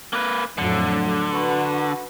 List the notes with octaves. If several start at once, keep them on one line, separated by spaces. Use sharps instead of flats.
A#3 B4
F2 A2 D3 F#3
F#4 B4